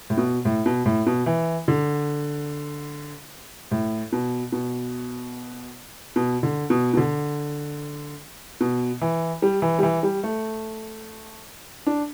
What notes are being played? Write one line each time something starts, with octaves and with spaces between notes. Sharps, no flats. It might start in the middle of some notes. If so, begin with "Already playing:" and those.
A2
B2
A2
B2
A2
B2
E3
D3
A2
B2
B2
B2
D3
B2
B2
D3
B2
E3
G3
E3
G3
E3
G3
A3
D4